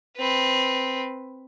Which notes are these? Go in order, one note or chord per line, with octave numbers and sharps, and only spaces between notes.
C4 B4